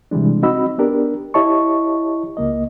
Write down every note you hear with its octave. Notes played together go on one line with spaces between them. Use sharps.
C3 E3 G3 G#3 D4
C4 D#4 F#4 D#5 B5 E6
B3 D4 G4 A#4
E4 G4 C#5 D#5 A5 C#6
C#2 A#3 D#5